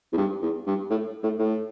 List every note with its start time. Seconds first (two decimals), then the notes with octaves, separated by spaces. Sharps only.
0.13 E2
0.17 G2
0.42 E2
0.67 G2
0.90 A2
1.23 A2
1.39 A2